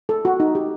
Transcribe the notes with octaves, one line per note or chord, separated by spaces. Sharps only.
A4
F#4
D#4
G4